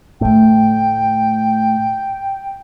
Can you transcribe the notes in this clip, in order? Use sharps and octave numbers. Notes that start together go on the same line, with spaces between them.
A2 D3 A3 G5